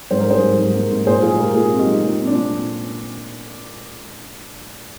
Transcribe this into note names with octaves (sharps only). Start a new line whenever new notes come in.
G#2 C5
A#4
G3 G#4 C5
G#2
G#2
A#3
G#2
A#2 G#4 C5
G#3 F4 G#4
A#2 G4 A#4
A#2 F4 G#4
C4
D#4 G4
G#3
A#2
C4
D4
A#2